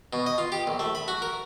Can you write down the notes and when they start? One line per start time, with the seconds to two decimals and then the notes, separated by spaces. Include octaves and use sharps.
0.13 B2
0.26 D#5
0.38 F4
0.52 G4
0.67 A#1
0.79 A3
0.95 B5
1.08 F#4
1.22 A#4